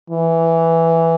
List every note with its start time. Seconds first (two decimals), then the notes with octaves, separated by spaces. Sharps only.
0.10 E3